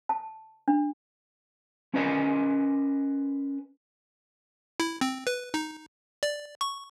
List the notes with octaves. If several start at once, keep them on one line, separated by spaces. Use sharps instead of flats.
A5
D4
C#4 A#4 B4 D#5 G#5
E4
C4
B4
D#4
D5
C#6